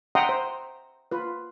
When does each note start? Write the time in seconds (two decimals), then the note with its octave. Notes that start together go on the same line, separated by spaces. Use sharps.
0.15 E5 F#5 G5 A#5 C6 D#6
0.29 C5
1.11 F4 B4